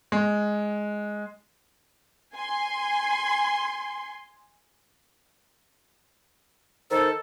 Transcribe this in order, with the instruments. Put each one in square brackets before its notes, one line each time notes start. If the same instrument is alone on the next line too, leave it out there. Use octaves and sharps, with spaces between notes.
[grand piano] G#3
[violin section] G#5 C6
[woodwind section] D#3 A4 [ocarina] C5